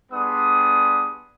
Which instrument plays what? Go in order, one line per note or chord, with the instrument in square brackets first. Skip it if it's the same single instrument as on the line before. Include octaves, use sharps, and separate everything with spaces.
[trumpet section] G3 B3 D4 G#4 C6 D#6